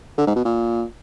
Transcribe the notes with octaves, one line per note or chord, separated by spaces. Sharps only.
D3
G#2
B2
A#2